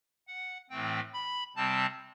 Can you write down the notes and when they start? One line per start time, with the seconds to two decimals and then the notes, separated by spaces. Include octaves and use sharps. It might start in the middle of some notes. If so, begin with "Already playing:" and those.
0.27 F#5
0.70 A2 E3 A3 C4 G5
1.14 B5
1.56 C3 G3 C4 A5